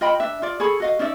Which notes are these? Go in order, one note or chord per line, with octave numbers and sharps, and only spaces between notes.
F4 D#5 G5 B5
D4 E5
F4 D5
G#4 A4 C#5 B5
F#4 D#5 F5
C#4 D#4 D5 E5